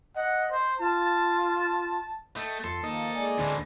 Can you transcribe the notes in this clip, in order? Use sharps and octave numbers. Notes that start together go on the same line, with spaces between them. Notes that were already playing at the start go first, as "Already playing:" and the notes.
D#5 F#5
C5
F4 A5
A3 A4 D#5 G5
F2 A4 C6
D#3 F3 A#3 D#4 D#5
G#3 D5 G#5
D2 A2 D3 E3 C4